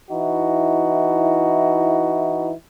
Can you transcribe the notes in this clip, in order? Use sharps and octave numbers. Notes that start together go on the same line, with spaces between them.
E3 D#4 E4 F#4